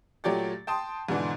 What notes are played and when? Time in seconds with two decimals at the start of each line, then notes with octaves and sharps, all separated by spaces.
0.24 A#2 F#3 A3 G4 D5 A6
0.67 G5 A5 C6 D#6
1.09 G#2 B2 D3 E3